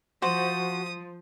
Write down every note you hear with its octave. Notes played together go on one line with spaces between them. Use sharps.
F3 F#4 C5 D#6